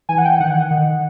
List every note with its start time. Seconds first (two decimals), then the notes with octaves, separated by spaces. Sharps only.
0.09 E3 G#5
0.18 F#5
0.25 G5
0.40 D#3 F#5
0.71 D#3